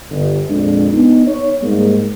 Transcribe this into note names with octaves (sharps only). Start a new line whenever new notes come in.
G1
F2 A#2 G#3 D4
B3 D#4
C#5
G#2 G3 A#3